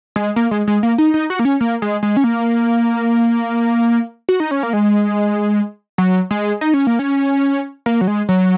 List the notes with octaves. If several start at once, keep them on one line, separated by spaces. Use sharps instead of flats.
G#3
A#3
G#3
G#3
A#3
D#4
D#4
F#4
A#3
C#4
A#3
G#3
G#3
C#4
A#3
F#4
D#4
C#4
A#3
G#3
F#3
G#3
D#4
C#4
A#3
C#4
A#3
F#3
G#3
F#3